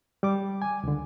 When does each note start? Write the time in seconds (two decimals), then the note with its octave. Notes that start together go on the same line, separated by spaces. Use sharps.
0.23 G3 D6
0.62 G#5
0.83 C#2 D3